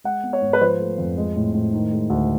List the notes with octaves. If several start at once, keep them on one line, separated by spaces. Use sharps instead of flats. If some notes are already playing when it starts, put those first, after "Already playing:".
G#3 F#5
B3
C#5
G#2
B4
F3 C5
A3
F2
G#3
A2
A2
D#3
G#3
D2